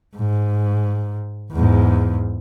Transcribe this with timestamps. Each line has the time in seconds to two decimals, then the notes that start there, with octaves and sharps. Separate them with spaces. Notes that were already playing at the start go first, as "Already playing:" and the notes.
0.16 G#2
1.52 E2 G#2